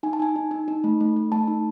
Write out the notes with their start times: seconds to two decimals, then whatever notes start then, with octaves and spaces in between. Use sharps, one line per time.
0.03 D#4 G#5
0.13 A5
0.20 D#4 G#5
0.36 D#4
0.51 D#4
0.68 D#4
0.84 A3
1.00 A3
1.16 A3
1.32 A3 A5
1.48 D#4